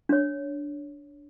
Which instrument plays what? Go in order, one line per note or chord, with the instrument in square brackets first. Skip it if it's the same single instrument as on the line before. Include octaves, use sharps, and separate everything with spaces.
[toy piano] D4 C#5